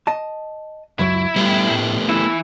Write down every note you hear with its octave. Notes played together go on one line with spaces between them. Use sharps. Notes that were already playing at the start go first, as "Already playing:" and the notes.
D#5 A5
C#2 F#2 F#3 E4
G3 A3 B3 G4
A2 G5
E3 E4 E5